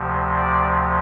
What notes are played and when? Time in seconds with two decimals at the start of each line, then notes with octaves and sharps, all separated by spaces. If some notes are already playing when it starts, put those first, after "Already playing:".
Already playing: D2 C3 F3
0.36 D5